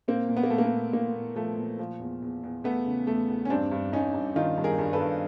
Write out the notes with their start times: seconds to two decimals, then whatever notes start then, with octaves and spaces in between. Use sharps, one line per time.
0.08 A#2 A#3 C4
0.29 A#2
0.37 B3
0.43 A#3
0.50 A#2 A3
0.58 A#3
0.65 A3 B3
0.72 A#2
0.93 A#2 A#3
1.15 A#2
1.36 F3 A3
1.57 A#2
1.79 F3
2.00 E2
2.22 E2
2.43 E2
2.64 E2 A3 B3
2.86 C#3
3.07 E2 A3
3.28 E2
3.45 C#4
3.50 G2 C4 D4
3.72 G2
3.92 G2 C#4 D#4
4.14 G2
4.36 D#3 D#4 F4
4.58 G2
4.64 G#4 A#4
4.78 G2
4.93 A4 B4
5.00 G2